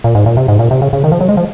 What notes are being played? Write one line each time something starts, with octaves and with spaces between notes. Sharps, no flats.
A#2
G#2
A#2
C3
G#2
A#2
C3
C#3
C#3
D#3
F3
F#3
G#3
F3